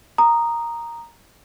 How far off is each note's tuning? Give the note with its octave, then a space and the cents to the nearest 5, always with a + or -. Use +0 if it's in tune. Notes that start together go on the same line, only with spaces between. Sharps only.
A#5 +0 D#6 -15